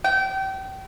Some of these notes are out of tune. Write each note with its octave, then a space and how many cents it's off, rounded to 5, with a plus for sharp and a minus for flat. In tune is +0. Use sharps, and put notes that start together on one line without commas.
G5 -30